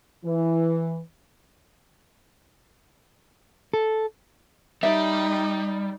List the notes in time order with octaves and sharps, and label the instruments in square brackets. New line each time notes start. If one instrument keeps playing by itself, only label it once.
[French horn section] E3
[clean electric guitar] A4
[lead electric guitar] G3 [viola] D#4 [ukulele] E5